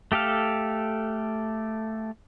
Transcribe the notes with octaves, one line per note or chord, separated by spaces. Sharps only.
A3 G4 A4 F5